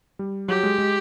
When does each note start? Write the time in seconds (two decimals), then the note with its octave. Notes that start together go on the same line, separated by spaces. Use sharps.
0.19 G3
0.48 F#3 G4
0.63 G#3
0.78 G#3